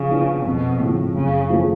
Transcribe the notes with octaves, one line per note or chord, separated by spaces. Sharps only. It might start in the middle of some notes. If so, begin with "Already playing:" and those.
Already playing: C#3 F3
B3 D4 F4
F2 B2
A2 C#3 F3
F#2 C#3
F3 A3 F4 G#4